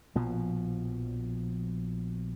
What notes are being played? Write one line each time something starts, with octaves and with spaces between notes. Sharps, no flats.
A#1 B2 F3